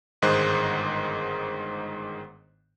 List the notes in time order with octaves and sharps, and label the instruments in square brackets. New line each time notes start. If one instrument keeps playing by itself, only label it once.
[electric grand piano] G1 G#2 D#3 G#3 C5 F#6